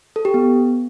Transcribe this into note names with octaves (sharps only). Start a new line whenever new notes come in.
A4
G4
B3